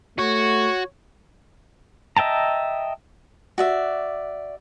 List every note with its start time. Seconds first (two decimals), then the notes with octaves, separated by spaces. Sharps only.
0.19 A3 F#4 C#5
2.17 D#5 E5 G5 A5 A#5
3.58 F#4 D5 E5